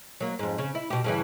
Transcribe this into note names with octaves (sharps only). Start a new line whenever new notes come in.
F#3 A#3
F2 G#2
C#3
E4
B2 G4
G2 C#3 E3